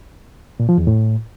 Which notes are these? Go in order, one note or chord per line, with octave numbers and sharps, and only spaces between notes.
A#2
F3
E2
A2